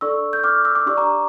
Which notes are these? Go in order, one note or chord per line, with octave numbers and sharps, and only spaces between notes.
D4 A4 D5 C#6 E6
G6
D6 F6
E6
D6
D4 G4 D5 C#6
A#5 D6